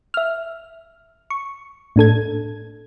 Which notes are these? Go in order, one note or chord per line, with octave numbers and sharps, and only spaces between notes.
E5 F6
C#6
A2 D4 A4 G#6